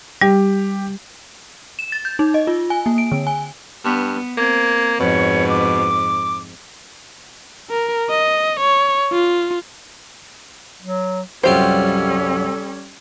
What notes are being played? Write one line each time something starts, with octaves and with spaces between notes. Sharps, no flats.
G3 G4
E7
A6
G6
D#4
D#5
F4
G#5
A#3
D7
D3
G#5
G2 B3
A#3 C4 G#6
F2 G#2 B2 C#5
D6
A#4
D#5
C#5
F4
F#3
C2 F#2 G3 C#4 F4 G4 A4 C5